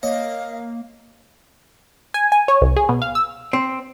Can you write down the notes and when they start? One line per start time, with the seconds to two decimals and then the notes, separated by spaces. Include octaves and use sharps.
0.03 A#3 C#5 D#5 F5
2.14 G#5
2.32 G#5
2.48 C#5
2.61 C2
2.77 G#4
2.89 B2
3.02 F5
3.15 E6
3.53 C4